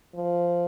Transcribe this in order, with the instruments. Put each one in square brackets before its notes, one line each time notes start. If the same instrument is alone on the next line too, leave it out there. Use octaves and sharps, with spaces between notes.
[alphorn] F3